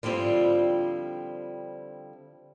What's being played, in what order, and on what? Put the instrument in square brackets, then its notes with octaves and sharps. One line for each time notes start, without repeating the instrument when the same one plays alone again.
[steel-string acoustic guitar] D3 F3 G3 C4 E4 F4